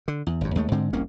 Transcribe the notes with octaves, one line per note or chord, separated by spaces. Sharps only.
D3
E2
G#1 F#2
D#2 G#3 A3
G#2 D3 G#3 C4
F1 C2 A#3 C#4